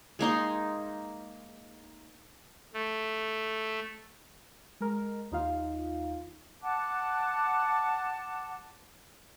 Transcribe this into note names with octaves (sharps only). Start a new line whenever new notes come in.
G#3 A#3 D#4 C6
A3
G#3 A#4
D#2 D#4 F4 F5
F#5 A5 D6 F#6